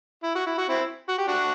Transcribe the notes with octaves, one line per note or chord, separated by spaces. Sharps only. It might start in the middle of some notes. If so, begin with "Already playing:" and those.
E4
F#4
E4
F#4
C4 E4
F#4
G4
D4 F#4